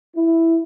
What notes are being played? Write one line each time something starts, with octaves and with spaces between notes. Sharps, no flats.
E4